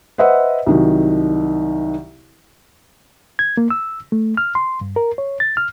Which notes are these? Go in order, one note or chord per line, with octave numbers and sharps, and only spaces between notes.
B4 C5 D#5 E5 F#5
C2 D#3 F#3
G#6
A#3
E6
A3
F6
C6
G2
A#4
C#5
A6
F6